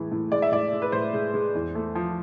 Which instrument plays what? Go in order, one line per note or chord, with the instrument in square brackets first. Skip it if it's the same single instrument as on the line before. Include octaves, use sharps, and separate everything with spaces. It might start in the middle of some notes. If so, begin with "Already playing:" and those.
Already playing: [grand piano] A2 E3 G#3
A2
G#3 D5
E5
A2 D5
G#3
B4
A2 C5
G#3
G#3
E2
A3
F3